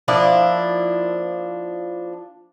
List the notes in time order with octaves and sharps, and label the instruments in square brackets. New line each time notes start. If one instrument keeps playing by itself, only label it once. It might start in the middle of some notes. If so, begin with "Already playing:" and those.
[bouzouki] F3 A#3 D4 E4